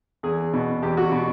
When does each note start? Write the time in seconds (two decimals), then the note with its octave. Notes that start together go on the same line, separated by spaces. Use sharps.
0.23 E2 G#4
0.53 B2
0.82 E2 G4
0.97 F#4
1.12 B2